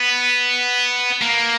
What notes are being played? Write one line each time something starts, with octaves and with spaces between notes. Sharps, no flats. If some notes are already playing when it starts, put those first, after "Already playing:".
Already playing: B3
A#3